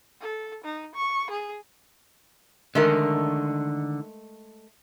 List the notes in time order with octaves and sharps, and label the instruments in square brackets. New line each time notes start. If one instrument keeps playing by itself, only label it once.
[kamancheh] A4
D#4
C#6
G#4
[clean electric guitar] D3 D#3 [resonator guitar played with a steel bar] G#3 A3 A#4